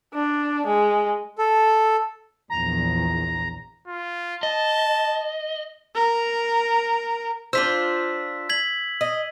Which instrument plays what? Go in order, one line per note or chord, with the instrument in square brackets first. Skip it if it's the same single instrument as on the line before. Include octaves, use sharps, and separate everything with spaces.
[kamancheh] D4
G#3
[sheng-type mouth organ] A4
[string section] A#1 E2 [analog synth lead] A#5
[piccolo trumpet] F4
[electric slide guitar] D#5 [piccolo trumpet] A5
[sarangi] A#4
[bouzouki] D4 F4 C5 [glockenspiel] E6 B6
[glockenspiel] G#6 B6 F#7
[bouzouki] D#5